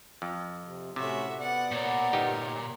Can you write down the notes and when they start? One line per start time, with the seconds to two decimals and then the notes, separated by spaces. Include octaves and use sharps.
0.22 F2
0.65 C3
0.96 A2 C3 C#4 F#4 E5
1.39 B3 D5 F#5
1.71 A#2 A#4 C#5
2.13 G1 D#4 G4